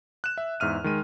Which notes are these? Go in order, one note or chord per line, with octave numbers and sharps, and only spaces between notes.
F#6 E7
E5
E2 G#2 E5 F6 D#7
D#3 G#3 D#7